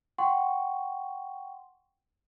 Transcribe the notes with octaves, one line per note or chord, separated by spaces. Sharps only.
F#5 G5 C6 C#6